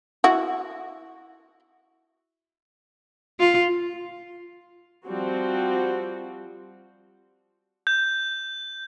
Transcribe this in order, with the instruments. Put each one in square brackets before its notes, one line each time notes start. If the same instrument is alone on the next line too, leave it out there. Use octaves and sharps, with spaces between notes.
[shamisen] E4 F#4
[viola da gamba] F4
[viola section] F3 G3 C4 F#4
[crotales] G6